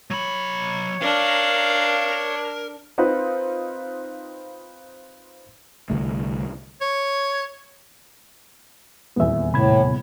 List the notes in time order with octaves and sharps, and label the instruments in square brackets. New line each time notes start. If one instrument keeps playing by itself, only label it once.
[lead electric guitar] F#3 B5 [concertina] C#5
[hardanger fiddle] D4 [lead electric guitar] A#4 [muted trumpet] F5
[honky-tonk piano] C4 D#4 F4 B4
[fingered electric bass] C2 D3 A3
[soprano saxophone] C#5
[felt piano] D#1 E2 [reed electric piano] B3 E5
[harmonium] A2 [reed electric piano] C3 B5 G#6